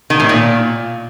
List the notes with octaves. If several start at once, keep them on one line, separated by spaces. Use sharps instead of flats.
D#3
A2
A#2